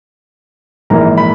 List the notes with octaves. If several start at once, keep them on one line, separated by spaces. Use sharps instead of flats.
A#1 G#2 E3 A#3 A#5
B5